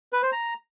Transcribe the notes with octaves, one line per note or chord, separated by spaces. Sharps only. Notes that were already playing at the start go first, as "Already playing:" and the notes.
B4
C5
A#5